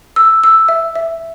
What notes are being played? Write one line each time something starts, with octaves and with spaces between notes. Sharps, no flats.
E6
E6
E5
E5